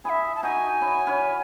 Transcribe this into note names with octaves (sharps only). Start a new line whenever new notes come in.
E4 G#4 E5 G#5
A5
D#4 F#4 G#5
C#4 E4
C#4 E4